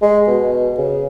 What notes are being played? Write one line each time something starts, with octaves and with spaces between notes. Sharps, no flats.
G#3
B2
C#3